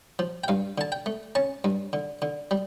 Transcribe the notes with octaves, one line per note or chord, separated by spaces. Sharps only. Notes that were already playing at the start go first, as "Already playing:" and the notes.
F3
G5
G2 F5
D3 A5
G5
A3
C#4 A5
G2
D3
D3
G3